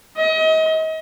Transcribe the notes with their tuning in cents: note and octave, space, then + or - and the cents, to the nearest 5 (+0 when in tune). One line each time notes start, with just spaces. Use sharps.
D#5 +35